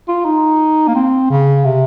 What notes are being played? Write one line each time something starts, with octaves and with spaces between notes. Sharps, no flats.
F4
D#4
A#3
C4
C#3
C3